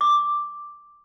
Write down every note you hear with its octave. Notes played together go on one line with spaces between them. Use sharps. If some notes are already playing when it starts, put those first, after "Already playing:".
D6